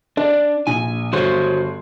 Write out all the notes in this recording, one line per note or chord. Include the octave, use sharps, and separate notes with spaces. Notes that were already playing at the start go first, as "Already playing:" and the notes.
D4 D5
A#1 G#5
G1 F#4 C5 C#5 C6